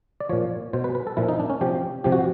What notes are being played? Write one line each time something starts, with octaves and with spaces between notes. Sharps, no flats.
D5
A#2 F3 C#5
B2 C5
B4
B4
A4
A#2 F3 E4
D#4
D4
C#4
C3 F3 G4
C3 F3 G4
F#4